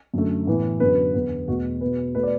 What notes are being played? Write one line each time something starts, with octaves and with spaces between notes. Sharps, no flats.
F#2 D3 A3
A2 E3 B3
F#2 D3 F#3 B3 B4
E2 D3 B3
E2 B2 A3 F#4
B2 B3 B4
B2 A3 B4
D5